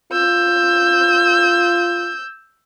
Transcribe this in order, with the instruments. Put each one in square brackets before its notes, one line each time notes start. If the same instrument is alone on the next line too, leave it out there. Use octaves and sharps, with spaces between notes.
[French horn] F4 [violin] E6 G6